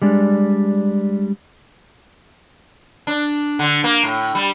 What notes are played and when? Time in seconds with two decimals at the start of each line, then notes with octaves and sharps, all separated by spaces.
0.02 G3 G#3 D4
3.07 D4
3.59 D3
3.84 A#3
4.03 A2
4.35 G3